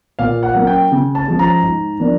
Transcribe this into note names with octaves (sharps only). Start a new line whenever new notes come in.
A#2 F5
F#5
F#3 A#3 C#4
G5
C#3
A5
F3 G#3 C#4
A#5
G#2
F3 A#3 D4